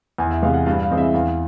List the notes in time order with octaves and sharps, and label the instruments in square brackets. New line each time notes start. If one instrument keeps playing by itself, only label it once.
[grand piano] E2 G#5
E5
C3 E3 G#3 F5
F#5
G2 F5
F5
E3 G#3 C4
E5
E2 F5